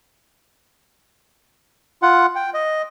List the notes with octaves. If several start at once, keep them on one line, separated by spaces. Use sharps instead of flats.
F4 F#5
G5
D#5